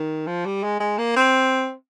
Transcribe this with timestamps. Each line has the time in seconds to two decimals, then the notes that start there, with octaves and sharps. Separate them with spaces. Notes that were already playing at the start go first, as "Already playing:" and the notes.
Already playing: D#3
0.27 F3
0.45 G3
0.63 G#3
0.80 G#3
0.98 A#3
1.16 C4